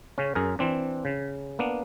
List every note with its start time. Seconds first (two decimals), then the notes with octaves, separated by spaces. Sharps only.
0.18 C#3 C#4
0.35 F#2 G#4 A#4
0.59 E3 C4 D4
1.05 C#3
1.59 A#3 B3 D4